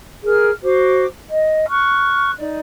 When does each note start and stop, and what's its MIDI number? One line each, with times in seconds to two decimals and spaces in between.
0.24 0.50 68
0.24 0.50 70
0.24 0.50 89
0.61 1.04 66
0.61 1.04 72
0.61 1.04 86
1.29 1.66 75
1.68 2.30 85
1.68 2.30 89
1.68 2.30 90
2.37 2.59 63
2.37 2.59 74